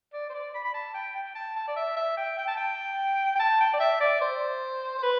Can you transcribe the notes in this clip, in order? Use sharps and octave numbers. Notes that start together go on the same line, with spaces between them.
D5
C5
D5
B5
B5
A5
G5
G5
A5
A5
D5
E5
E5
G5
G5
A5
G5
G5
A5
G5
D5
E5
D5
C5
C5
B4